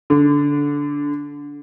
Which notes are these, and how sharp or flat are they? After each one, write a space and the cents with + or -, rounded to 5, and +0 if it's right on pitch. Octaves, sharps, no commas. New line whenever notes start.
D3 -20